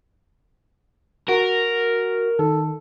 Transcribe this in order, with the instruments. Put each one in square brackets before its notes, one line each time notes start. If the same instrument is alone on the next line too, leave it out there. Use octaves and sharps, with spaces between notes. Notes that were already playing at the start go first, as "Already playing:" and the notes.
[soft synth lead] F#4 [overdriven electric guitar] A#4
[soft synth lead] D#3 [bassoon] A4